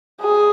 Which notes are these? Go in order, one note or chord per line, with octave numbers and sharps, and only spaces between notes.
G#4